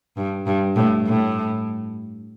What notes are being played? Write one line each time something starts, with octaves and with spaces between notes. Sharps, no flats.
G2
G2
A2
A2